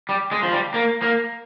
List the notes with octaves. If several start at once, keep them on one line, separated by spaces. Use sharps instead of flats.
G3
G#3
F3
G3
A#3
A#3